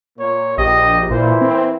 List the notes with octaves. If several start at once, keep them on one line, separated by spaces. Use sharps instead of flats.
A#2 A#3 C#5
A#1 G4 D#5
A#2 E3 A#3 E4 C5
C4